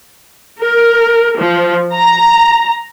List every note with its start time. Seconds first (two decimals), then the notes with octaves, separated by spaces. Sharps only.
0.61 A#4
1.38 F3
1.94 A#5